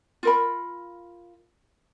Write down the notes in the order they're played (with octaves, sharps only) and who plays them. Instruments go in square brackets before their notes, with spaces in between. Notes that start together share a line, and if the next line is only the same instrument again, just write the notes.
[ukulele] F4 A#4 B5